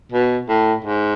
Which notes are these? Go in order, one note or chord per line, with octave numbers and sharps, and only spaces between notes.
B2
A2
G#2